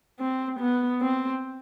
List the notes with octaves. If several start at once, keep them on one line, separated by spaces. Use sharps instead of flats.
C4
B3
C4